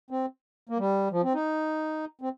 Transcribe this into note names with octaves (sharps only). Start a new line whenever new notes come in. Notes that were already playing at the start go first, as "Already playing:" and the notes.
C4
A#3
G3
F3
C4
D#4
C4